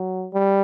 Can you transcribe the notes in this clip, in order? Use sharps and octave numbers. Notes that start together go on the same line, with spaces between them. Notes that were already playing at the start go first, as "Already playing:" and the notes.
Already playing: F#3
G3